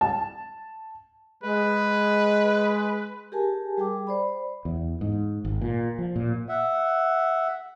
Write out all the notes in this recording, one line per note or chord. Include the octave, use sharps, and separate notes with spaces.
A5
G#3 B4
G4 G#4 A#4 G#5 A5
G3 G#4 G5 D6
C5 D5 B5
E2
G#2
G#1
A#2
F3
A#2
E5 F#5